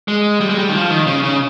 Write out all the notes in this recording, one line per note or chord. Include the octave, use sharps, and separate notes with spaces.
G#3
G3
G#3
G3
D#3
F3
D#3
C#3
C#3